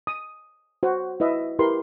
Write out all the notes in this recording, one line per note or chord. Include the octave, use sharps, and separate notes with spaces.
D#6
F#4 C5 F#5
E4 B4 D#5 E5
E4 G4 A#4 B4 C6